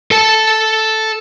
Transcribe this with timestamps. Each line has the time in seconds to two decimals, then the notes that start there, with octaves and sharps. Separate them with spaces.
0.11 A4 A5